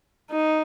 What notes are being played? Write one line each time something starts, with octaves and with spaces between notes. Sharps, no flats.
D#4